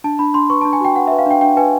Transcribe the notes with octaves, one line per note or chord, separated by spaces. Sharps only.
D4 A5
D4 B5
D4 C6
B4 C#6
D4 A5
G#5
F#4 G5
B4 F#5
B4 E5
F5
D4 G5
D4 G5
B4 G#5